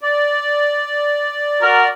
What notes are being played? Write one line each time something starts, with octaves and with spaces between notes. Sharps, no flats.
D5
F#4 A#4